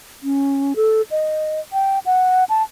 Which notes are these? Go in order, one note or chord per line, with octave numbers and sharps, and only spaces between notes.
C#4
A4
D#5
G5
F#5
A5